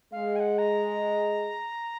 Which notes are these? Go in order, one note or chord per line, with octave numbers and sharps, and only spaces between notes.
G#3 F5
G#5
F#5
A#5